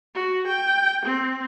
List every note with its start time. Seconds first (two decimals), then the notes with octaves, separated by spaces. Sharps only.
0.15 F#4
0.47 G5
1.06 C4